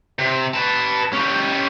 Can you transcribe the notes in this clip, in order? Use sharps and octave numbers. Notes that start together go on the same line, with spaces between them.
C3
B4 A5
C#4 G4